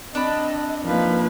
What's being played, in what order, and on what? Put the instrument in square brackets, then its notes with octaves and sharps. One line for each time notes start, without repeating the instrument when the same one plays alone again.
[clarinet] C4 [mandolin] D4 B5 [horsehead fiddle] D#5
[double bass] F3 A#3 [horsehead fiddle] D#4 B4